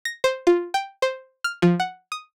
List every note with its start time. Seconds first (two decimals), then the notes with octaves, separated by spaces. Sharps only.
0.05 A#6
0.24 C5
0.47 F4
0.74 G5
1.02 C5
1.44 F6
1.62 F3
1.80 F#5
2.12 D#6